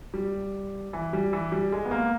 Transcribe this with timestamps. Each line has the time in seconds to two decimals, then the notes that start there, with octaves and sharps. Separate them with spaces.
0.14 G3
0.93 E3
1.13 G3
1.33 E3
1.52 G3
1.72 G#3
1.85 B3
1.91 A#3